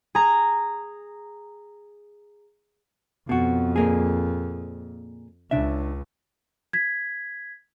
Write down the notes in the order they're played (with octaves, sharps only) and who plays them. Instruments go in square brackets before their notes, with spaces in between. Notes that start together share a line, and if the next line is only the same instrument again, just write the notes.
[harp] G#4 A#5
[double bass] F2 [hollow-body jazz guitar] B2 F#4
[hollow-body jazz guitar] A#2 A#3 G#4
[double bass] C#2 C#3 [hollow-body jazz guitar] D4 E5
[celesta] G#6 B6